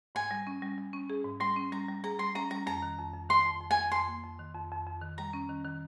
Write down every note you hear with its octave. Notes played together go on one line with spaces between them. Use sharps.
G#2 G#5
G3
C#4
G3
G3
C#4
G#4
G#2
G3 C6
C#4
G3 A#5
G3
G#4 A#5
G3 C6
C#4 A#5
G3 A#5
F2 A#5
D#3
F2
F2
D#3 C6
F2
F2
G#5
F2
F2 C6
A#3
F2
D#3
F2
F2
F2
D#3
G3 A#5
C#4
D#3
D#3